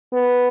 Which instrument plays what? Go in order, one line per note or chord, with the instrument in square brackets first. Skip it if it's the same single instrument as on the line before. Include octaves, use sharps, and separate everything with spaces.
[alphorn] B3